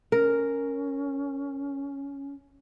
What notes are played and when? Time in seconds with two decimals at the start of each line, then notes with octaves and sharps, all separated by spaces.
0.12 C#4 A#4